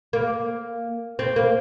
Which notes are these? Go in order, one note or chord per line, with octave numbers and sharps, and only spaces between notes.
A#3
C4
A#3